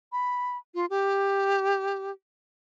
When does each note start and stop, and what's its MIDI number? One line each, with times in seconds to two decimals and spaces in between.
0.12 0.57 83
0.75 0.86 65
0.90 2.11 67